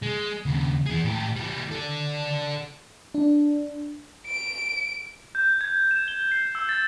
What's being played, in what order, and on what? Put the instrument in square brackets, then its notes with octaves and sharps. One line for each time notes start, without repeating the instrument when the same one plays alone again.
[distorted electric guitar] G#3
D#2 C#3
E3 G#4
A2 G4
E3 G3
A4 D5
[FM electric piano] D4
[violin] D7
[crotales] G6
G#6
E7
G7
C7
E6
A6